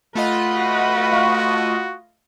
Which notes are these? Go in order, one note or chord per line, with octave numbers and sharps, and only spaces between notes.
A3 F4 B4 D#5 F#5
F#4
F5 C#6